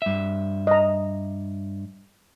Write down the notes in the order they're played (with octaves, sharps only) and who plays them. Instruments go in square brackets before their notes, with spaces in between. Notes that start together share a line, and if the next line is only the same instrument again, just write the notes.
[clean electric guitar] G2 E5
[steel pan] D#5 A#5